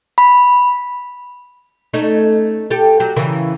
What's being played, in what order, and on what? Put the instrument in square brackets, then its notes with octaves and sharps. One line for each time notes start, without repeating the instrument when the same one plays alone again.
[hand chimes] B5
[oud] A3 C#4 D#4
G4 A4
F#3 G4
C#3 E3 A#4